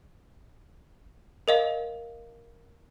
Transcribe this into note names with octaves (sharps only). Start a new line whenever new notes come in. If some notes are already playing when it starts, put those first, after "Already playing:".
A#4 D#5 F5